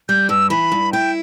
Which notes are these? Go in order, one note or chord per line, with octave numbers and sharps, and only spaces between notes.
G3 G6
G2 E6
E3 B5
G2
E4 G5